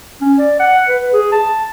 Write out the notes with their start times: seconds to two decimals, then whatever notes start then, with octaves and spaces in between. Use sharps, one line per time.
0.21 C#4
0.39 D5
0.60 F#5
0.89 B4
1.13 G#4
1.32 A5